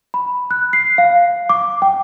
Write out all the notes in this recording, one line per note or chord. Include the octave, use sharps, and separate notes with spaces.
B5
F#6
C7
F5
D6
G5